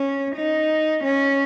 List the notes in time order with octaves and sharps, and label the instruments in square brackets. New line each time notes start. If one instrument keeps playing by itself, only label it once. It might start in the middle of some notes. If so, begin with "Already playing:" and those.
Already playing: [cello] C#4
D#4
C#4